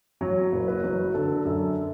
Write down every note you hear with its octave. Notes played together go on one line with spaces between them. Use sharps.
F#3 C#5
F#1
B4
F#3
D3 A4
F#2